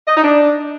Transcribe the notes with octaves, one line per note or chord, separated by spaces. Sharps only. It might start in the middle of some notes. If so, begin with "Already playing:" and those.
D#5
D#4
D4